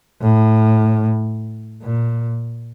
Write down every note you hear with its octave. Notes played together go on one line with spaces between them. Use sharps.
A2
A#2